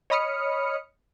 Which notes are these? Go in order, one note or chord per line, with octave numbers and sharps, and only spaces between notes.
C#5 D#5 B5 D#6 F6 C#7